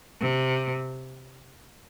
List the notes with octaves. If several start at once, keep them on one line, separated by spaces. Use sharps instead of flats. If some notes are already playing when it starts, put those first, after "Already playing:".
C3